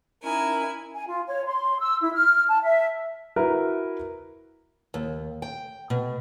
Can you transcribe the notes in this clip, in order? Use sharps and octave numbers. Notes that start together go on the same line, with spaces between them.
C#4 D#4 E4 A#4 G#5
G#5
F4
C#5
C6
E6
E4
F6
A5
E5
E4 F#4 A#4 B4
D#2
G5
B2